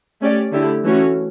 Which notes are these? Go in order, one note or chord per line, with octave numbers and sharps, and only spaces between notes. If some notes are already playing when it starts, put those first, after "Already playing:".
A3 C#4 G4 D5
D3 A3 E4 G4
E3 A3 C#4 F#4